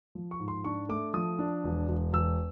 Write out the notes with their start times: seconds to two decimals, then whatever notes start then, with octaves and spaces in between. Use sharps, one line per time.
0.15 F3
0.31 C#6
0.40 G#2
0.48 C6
0.64 D4 C#6
0.89 A3 D6
1.14 F3 D#6
1.39 D4
1.64 E1
1.89 E1
2.13 E1 E6